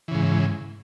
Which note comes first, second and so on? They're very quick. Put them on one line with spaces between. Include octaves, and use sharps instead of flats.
E3 C#3 G#2